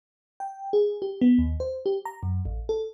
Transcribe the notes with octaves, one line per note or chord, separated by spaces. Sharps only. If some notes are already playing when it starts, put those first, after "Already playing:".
G5
G#4
G4
B3
D#2
C5
G4
A#5
F#2
A1
A4